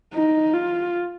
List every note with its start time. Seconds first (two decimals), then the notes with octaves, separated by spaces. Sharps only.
0.14 D#4
0.54 F4